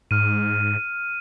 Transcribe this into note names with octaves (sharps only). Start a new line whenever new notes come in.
G#2 F6 D#7